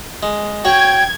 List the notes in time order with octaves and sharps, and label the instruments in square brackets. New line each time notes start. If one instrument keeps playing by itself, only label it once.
[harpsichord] G#3
[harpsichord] F#4 C#5 [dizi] G5 [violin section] G#6